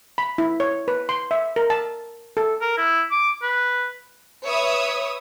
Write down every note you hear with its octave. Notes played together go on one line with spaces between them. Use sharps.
B5
E4
C#5
B4
C6
E5
A#4
A5
A4
A#4
E4
D6
B4
B4 C#5 E5 D#6 E6